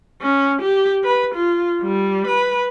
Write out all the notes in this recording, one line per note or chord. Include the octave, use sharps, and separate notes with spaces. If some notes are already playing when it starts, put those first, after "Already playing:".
C#4
G4
B4
F4
G3
B4